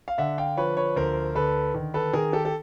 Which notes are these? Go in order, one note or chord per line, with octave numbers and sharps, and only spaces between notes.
F5
D3 E5 F#5
F5 G5
F3 B4 C#5
B4 C#5
D2 A#4 C5
D3 A4 B4
D#3
A4 B4
D#3 G#4 A#4
G4 A4
A4